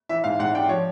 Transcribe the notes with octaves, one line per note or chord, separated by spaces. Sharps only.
E3 E5
G#2 F5
G#2 F#5
D4 G5
F3 C#5